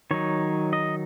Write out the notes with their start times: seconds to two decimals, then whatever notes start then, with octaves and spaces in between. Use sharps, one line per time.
0.11 D#3 F#3 D#4 C#5
0.73 D#5